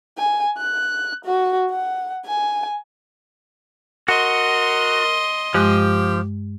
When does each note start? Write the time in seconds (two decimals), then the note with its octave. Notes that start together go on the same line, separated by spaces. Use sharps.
0.18 G#5
0.58 F#6
1.25 F#4
1.70 F#5
2.26 G#5
4.08 F#4 A#4 D#5 C6
5.54 G2 F3 G#3 G4 F#6